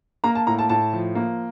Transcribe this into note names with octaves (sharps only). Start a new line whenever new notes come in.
A#3 A#5
A5
A2 A#5
A5
A2 A5
F3
A#3